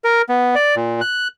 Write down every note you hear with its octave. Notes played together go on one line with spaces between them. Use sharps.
A#4
B3
D5
A#2
F#6